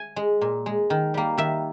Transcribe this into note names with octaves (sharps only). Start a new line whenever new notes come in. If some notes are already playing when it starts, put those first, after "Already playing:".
Already playing: G#5
G#3
A#2
G#3
D#3
G3 A#3
D#3 E5